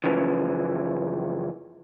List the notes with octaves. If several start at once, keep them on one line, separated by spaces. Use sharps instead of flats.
F#2 C#3 E3 F3